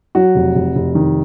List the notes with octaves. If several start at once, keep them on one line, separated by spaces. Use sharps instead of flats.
F#3 F#4
F1
F1
F1
D#3